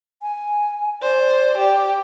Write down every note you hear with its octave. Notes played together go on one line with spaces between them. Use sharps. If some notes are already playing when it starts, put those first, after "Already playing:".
G#5
C5 D5
G4